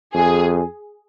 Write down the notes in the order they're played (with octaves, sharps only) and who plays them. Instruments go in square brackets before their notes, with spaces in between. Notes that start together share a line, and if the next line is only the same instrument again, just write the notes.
[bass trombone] F2 [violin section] G#4